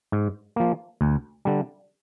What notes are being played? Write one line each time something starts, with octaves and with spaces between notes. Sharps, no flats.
G#2
F3 A#3
D2
D3 G3